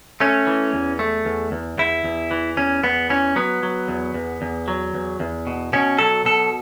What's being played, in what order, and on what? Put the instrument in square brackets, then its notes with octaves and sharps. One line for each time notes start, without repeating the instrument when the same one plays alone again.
[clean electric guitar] A3 C#4
E3
E2
A3
E2
E2
E2 E4
E2
E3
E2 C#4
E2 B3
E3 C#4
F#3 B3
F#3
E2
E2
E2
F#3
E2
E2
B2
B2 C#4
F#3 A4
B2 A4